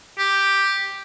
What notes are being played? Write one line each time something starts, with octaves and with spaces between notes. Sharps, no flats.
G4